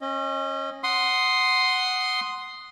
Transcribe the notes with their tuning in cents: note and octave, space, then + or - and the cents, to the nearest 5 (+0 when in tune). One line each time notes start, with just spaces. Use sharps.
C#4 -30 D#5 +0
F#5 +0 C6 +0 D#6 +0